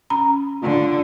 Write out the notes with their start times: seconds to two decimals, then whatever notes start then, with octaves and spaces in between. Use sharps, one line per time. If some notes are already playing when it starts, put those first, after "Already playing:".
0.10 C#4 A#5 B5
0.63 D3 F4